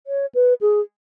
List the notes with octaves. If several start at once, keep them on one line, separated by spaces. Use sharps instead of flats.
C#5
B4
G#4